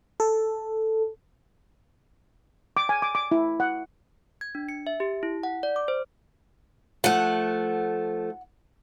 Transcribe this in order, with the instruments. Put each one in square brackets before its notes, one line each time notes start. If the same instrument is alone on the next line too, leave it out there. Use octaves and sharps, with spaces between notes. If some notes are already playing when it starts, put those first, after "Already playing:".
[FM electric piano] A4
[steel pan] D6
G#5
D6
D6
E4
F#5
[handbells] G#6
D4
C#7
E5
G4
E4
F#5
D5
D6
C5
[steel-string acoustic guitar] F3 A3 [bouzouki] F#5